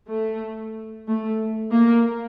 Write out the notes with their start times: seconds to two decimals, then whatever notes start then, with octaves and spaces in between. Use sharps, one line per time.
0.09 A3
1.07 A3
1.72 A#3